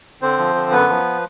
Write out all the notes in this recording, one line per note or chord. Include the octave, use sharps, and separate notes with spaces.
D3 C4 C5
F3
D3
F#2 B3 B4
F3